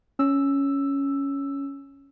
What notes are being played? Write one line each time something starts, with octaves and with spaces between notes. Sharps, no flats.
C#4 E6